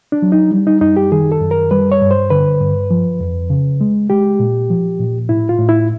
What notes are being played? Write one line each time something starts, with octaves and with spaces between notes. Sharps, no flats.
D4
F#3
D#4
G3
D#4
F#2 D#4
G4
D#3 G#4
A4
F#2
A#4
G3 B4
C#5
G2
C5
D3 B4
G2
F3
F2
C#3
G#3
G#3 G4
A#2
F3
A#2
A2 E4
F4
A2
E4